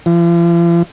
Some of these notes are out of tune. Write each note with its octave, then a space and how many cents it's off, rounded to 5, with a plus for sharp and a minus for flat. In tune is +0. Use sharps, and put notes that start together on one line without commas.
F3 -45